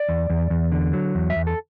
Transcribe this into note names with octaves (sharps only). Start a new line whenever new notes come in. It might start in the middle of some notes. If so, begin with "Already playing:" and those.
Already playing: D5
E2
E2
E2
D3
F#3
E2
E5
E2
A4